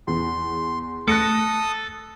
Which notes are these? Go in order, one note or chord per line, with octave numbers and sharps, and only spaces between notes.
E2 C6
A3 A4 D#6 F#6 A#6 C#7